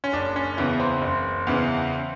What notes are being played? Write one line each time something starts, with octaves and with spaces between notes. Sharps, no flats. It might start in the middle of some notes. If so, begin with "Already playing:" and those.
C#4
F#1 D4
C#4
E2 C#3 E3 B3
C4
F#1
E2 C#3 E3